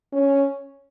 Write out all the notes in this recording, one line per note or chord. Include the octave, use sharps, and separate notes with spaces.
C#4